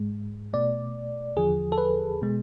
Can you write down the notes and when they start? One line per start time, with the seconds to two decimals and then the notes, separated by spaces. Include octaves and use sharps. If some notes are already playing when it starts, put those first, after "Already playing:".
Already playing: G#2 G#3
0.53 B2 A3 D5
1.36 E2 D3 F3 G#4
1.72 A4
1.78 B4
2.22 B2 G#3